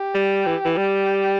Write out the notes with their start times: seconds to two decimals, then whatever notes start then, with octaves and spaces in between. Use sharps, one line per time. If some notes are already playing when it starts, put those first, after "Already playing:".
Already playing: G4
0.14 G3
0.46 E3
0.65 E3
0.77 G3 G4